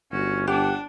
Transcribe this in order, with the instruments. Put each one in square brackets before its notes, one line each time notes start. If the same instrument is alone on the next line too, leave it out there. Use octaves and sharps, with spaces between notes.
[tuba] G1 [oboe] C#4 [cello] F#4
[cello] D4 [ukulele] G4 [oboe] F#5